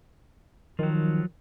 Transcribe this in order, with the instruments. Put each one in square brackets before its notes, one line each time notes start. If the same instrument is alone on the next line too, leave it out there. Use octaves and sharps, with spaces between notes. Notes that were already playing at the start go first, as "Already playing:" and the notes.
[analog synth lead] D#3 [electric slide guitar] F3 F#3